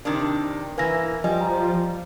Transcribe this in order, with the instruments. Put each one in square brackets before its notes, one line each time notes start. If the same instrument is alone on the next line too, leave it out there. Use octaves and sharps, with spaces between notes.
[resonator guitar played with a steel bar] C3 D#3 D4
[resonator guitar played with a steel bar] E3 A#3 [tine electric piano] B4 G#5 A#6
[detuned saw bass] F3 [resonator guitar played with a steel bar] G3 [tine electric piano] D#5 G#5
[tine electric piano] A#5